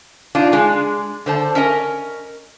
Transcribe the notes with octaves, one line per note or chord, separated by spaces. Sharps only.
D4 D#4 F4
G#3 D4
D3 C5 A5
C#4 A#4 D#5